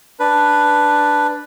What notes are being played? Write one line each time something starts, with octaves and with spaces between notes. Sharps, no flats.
D4 B4